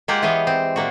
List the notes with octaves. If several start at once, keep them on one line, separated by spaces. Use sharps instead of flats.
G#3 A#3 F4 G4 F#5
E3 B3 C#5 D#5 F5
C4
A#2 A#3 F#4